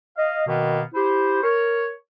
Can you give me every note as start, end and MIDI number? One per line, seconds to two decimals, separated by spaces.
0.17 0.43 75
0.17 0.43 77
0.47 0.82 47
0.47 0.82 51
0.47 0.82 58
0.47 0.82 59
0.95 1.42 64
0.95 1.42 67
0.95 1.42 72
1.43 1.92 70
1.43 1.92 73